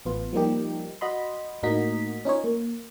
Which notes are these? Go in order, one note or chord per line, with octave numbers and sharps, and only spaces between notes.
A1 B3 F4
F3 G3 A#3 D#4 G4
F#4 D#5 B5 C6
A2 A#3 D#4 F#4 D#5 B6
C#4 D#4 F4 C#5
A#3